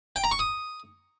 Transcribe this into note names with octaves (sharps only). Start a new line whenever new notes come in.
G5
A#5
C#6
D#6